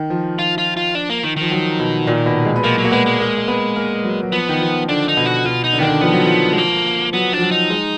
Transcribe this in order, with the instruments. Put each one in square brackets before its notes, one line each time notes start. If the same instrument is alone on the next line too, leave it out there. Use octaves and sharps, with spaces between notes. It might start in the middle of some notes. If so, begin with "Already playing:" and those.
Already playing: [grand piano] D#3
F3
[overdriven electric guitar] F4
F4
F4
D4
A#3
D#3
[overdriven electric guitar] D#3 [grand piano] F3
[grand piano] F#3
B2
A#2
B2
G#3
B3
[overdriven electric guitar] F3 [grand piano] A#3
[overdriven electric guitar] F#3
[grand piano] A#3
[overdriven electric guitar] G#3 [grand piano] B3
[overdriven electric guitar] G#3
[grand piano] A#3
A#3
B3
A#3
F#3
F#3
[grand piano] F3 [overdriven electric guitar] B3
[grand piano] D#3
F3
[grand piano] D3 [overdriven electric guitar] D4
[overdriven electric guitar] D#4
[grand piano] B2
[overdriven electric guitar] F#4
[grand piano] B2 [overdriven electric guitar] F4
[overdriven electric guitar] D#4
[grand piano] D3
[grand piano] D#3 [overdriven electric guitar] B3 D4
[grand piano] D3
[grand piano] F3 [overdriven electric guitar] B3
[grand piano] F#3
F3
[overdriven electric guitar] G#3
A#3
[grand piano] F#3 [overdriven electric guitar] B3
[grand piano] F3 [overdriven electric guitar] D4
[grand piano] F#3
[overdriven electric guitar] D#4
[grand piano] G#3